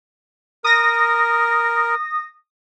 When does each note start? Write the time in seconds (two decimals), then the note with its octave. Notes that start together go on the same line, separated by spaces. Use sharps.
0.64 A#4 D#6 A#6